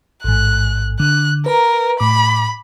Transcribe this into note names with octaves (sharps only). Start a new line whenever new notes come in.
A1 G#2 F#6
D3 F#6
A#4 B4 A#5
A2 B5 D6